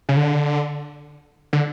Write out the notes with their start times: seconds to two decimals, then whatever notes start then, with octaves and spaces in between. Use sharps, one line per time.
0.09 C#3
0.17 D3
1.53 D3